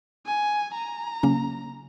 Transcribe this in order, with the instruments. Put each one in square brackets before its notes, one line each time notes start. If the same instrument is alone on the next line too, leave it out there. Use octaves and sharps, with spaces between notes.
[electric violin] G#5
A#5
[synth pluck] C#3 F#3 A#3 C#4